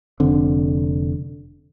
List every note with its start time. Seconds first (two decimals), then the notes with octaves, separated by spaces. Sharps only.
0.20 F1 D3 C4